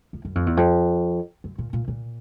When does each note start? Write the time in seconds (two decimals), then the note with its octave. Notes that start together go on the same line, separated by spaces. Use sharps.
0.13 F2
0.25 F#2
0.35 F2
0.46 E2
0.57 F2
1.44 F#2
1.58 A#2
1.73 A#2
1.88 A#2